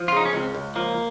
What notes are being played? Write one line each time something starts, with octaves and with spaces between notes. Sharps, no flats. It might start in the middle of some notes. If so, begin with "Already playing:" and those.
Already playing: F3
F4
C#3 D#4
C#4
C#2 C4
C#2
F3 A#3